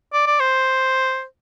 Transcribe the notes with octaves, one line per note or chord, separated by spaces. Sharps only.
D5
D5
C5